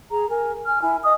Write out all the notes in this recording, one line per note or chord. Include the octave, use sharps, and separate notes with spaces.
G#4 A#5
A#4 G#5
G#5 F6
E4 G#5
D#5 D#6